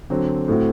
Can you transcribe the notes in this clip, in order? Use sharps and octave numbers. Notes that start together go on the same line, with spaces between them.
D3 F#3 C4
A2 A3 C4 F#4